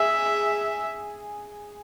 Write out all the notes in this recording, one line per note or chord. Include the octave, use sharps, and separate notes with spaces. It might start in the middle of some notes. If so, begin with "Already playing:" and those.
Already playing: G#4 E5